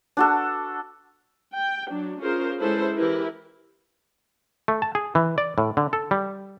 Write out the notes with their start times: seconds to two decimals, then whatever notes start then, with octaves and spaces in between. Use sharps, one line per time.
0.17 D4 F#4 A4
1.53 G5
1.89 F#3 D4
2.21 C#4 F4 G#4 A#4 C5
2.60 G#3 C#4 E4 A4 B4 C5
2.95 E3 E4 G4 A#4 B4
4.68 A3
4.82 A5
4.95 G#4
5.15 E3
5.38 D5
5.58 A2
5.77 D3
5.93 A4
6.11 G3